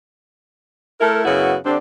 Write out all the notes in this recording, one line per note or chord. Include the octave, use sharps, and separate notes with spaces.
A3 E4 A4 A#4
F#2 C#3 B3 E4 F#4
D3 G3 C4 D4